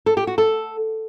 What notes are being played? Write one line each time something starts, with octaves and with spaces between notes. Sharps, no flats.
A4
G4
F#4
A4